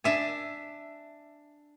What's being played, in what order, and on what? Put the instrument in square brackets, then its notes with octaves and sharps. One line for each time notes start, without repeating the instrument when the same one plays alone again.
[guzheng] D4 E5 G#5